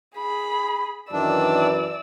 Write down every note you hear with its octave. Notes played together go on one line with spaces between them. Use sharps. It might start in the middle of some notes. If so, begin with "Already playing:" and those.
G#4 B5
F#2 D#3 E3 D4 D5 E6